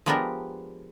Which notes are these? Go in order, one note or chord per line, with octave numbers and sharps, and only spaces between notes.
F3 G#3 B3 D4 G4 A#4